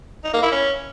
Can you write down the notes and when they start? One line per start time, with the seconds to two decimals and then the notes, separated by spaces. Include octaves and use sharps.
0.24 D#4
0.33 A#3
0.43 E4
0.52 C#4